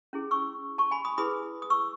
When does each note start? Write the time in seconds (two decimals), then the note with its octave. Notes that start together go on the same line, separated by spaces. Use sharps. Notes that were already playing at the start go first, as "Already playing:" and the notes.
0.13 C#4 E4 G#4
0.31 C#6 E6
0.78 A5 C#6
0.91 G#5 B5
1.05 B5 D#6
1.18 E4 G#4 B4 B5 D#6
1.62 D#6
1.70 C#6 E6